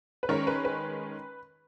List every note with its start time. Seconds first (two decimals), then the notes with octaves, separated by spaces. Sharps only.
0.23 B4
0.29 D#3 G#3 C#4 A#4 C#5
0.47 B4
0.65 B4